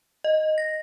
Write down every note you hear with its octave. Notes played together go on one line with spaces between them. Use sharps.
D#5
A#6